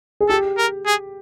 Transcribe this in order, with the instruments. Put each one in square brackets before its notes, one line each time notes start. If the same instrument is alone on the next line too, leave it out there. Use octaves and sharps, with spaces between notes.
[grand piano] G#4
[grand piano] G4 [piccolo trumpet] A4
[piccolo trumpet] A#4
G#4